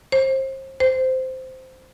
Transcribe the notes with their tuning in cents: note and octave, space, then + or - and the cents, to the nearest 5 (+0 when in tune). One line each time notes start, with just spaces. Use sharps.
C5 +35
C5 -10